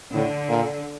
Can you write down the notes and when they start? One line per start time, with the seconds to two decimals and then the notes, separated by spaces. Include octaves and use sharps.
0.14 A2 D3
0.49 A#2